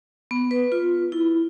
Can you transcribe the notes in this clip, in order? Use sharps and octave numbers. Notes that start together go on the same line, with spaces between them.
B3
B4
F4
E4